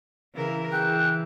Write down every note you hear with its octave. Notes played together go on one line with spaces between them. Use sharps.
C#3 E3 A#4
E3 G#4 G5 F#6